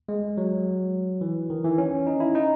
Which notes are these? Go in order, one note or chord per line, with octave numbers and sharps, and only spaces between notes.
G#3
F#3
E3
D#3
E3
C#4
D#4
E4
D#4